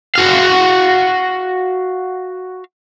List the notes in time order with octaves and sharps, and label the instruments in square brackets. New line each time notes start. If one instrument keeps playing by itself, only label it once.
[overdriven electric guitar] F#4 F5